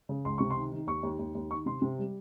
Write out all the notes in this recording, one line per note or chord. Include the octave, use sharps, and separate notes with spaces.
C#3
C#2 C6
C3 C#6
C6
D#3
D#3
D#2 C#6
D#2
D#2
D#2
D#3 C#6
C3 C6
C3
G3